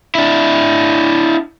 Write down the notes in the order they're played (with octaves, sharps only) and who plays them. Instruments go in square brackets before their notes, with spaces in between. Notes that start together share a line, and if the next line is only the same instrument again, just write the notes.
[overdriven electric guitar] D4 E4